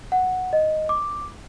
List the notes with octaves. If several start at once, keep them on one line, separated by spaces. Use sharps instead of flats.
F#5
D#5
D6